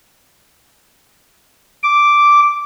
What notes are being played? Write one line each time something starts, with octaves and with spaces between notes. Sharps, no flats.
D6